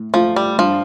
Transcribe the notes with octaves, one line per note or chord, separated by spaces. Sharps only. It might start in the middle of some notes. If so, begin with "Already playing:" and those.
Already playing: A2
F3 A3 F4
G3
G2 F3